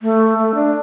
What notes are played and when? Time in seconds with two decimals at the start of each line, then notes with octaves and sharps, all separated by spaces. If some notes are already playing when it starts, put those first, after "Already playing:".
0.01 A3
0.38 A3
0.55 D4